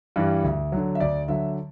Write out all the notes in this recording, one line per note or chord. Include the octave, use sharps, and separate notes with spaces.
G2 E3 G3
D2
D3 F#3
E5
D2 D5
D3 F#3 E5